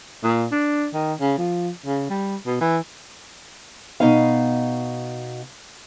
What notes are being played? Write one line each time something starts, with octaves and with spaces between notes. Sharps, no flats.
A#2
D4
D#3
C#3
F3
C#3
G3
B2
E3
B2 D#4 F5